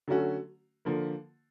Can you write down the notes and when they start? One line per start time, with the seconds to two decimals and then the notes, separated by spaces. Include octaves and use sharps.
0.08 D3 F#3 A3 C#4 F#4
0.85 D3 F3 A#3